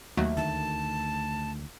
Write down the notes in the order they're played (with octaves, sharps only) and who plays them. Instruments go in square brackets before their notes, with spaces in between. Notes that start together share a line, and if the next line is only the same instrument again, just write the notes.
[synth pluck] D#2 F#3 [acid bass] A3
[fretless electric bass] D2 D#3 [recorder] A5